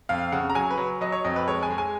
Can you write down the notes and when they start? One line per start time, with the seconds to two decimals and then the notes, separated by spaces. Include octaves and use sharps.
0.09 F2 F5
0.32 C#3 F#5
0.50 A#5
0.55 F#3 G#5
0.70 B4
0.77 F#3
1.01 F#3 D#5
1.12 C#5
1.24 F2 D#5
1.36 B4
1.47 G#3 C#5
1.63 G#5
1.70 G#3
1.78 G#5